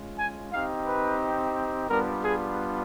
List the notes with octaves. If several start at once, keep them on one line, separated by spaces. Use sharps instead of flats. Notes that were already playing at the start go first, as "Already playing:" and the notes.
Already playing: G#3 C#4 F4
G#5
C4 D#4 G4 F5
B4
G3 B3 D4 F4 A#4
G#4